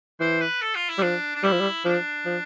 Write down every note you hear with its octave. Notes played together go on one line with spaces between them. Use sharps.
E3 C5
B4
A4
F4
E4
G3
F3 D4
D4
G3 E4
F3
G3
F3 D4
F3